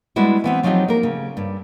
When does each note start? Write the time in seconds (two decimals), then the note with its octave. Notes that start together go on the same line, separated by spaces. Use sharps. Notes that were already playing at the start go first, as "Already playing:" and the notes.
0.16 G3 G#3 B3 D4 E4 F#4
0.44 E3 B3 C4
0.63 F3 F#3 C4 D#4 F4 G4
0.88 A#3 A#4
1.03 C#3
1.37 G2